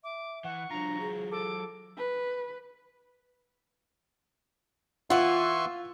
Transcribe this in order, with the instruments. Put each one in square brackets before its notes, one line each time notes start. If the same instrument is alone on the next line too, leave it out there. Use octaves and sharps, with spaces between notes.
[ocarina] E5 [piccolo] D6
[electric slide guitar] E3 [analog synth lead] F#5 [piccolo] C#6
[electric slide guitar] F#3 F4 [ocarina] D4 [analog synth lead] A#5
[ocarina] G#4
[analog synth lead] A4 [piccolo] D6
[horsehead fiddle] B4
[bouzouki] E3 F#5 [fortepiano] F4 [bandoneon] E5 C6 C#6